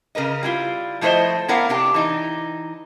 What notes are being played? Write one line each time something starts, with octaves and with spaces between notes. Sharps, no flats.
C#3 A#4 B4 D#5
G3 E4 F4
F3 A3 E4 A#4 C5 D#5
B3 E4 A#4 D5 F5 F#5
C3 D4 G4
E3 D#4